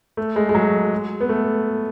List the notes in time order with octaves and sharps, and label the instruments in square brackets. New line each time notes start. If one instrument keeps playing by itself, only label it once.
[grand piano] A3
G#3
G#3
F#3
B3
A3